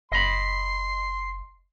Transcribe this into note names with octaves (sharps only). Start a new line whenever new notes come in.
F#1 D#5 B5 C6 C7